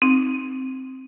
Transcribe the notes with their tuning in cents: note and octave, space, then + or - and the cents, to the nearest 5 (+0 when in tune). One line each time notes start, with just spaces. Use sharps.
C4 +0 D#4 +0